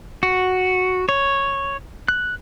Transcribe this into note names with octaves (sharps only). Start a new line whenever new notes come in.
F#4
C#5
F#6